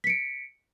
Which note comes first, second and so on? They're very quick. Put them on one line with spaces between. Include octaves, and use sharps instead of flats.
B6 C#7 D7